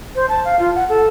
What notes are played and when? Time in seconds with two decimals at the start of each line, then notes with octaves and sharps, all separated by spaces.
0.15 C5
0.29 A5
0.45 F5
0.59 F4
0.75 F#5
0.89 A4